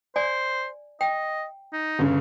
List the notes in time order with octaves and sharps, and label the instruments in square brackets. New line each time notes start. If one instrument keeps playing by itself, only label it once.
[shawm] C5 [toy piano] D5 G#5
[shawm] D#5 [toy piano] G5
[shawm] D#4
[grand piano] G1 C#3